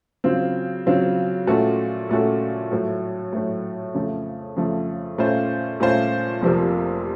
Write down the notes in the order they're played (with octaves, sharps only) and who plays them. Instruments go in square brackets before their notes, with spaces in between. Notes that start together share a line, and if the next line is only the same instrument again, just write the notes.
[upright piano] C#3 F#3 C4 F4
C#3 F#3 C4 F4
A#2 A3 C#4 F#4 A4
A#2 A3 C#4 F#4 A4
A2 F#3 A3
A2 F#3 A3
F2 C#3 F3 A3
F2 C#3 F3 A3
A#2 A3 C#4 F4 C5
A#2 A3 C#4 F4 C5
F1 F2 C3 F3 A#3